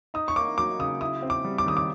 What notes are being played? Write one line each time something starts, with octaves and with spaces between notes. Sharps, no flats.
D#4 D#6
C#6
A#3 D6
F#3 D6
C#3 D#6
E4 D#6
C4
D6
G3
D6
D#3 D#6
D6